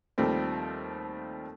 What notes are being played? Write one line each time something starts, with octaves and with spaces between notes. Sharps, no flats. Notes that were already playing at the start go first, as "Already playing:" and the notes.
D#2 F3 G3 A3 C4